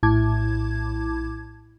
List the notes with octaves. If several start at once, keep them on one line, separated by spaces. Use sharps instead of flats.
A#1 A2 E4 A5 D6 G#6